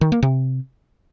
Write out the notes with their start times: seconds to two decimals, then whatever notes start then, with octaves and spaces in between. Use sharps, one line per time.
0.01 D#3
0.12 A#3
0.23 C3